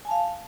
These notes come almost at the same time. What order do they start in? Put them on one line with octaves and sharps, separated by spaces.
G#5 A5 F5